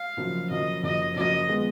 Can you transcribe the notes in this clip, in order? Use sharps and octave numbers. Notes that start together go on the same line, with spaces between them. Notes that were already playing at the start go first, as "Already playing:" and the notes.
Already playing: F5
F#1 F#2 F3
F#1 F#2 F3 D#5
F#1 F#2 F3 D#5
F#1 F#2 F3 D#5
F3 G#3 B3